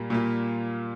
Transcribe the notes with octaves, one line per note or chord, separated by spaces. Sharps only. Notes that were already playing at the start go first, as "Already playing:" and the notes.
Already playing: A#2 G3 A#3 F4
A#2 G3 A#3 F4